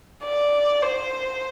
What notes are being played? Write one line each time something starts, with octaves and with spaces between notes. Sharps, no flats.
D5
C5